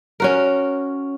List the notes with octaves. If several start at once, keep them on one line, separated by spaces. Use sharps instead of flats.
C#4 F#4 A#4